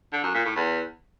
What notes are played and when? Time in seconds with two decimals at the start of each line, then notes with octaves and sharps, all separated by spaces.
0.13 D3
0.23 F#2
0.34 A#2
0.45 A2
0.56 E2